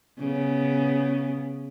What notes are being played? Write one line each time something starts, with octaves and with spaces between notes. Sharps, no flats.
C#3 B3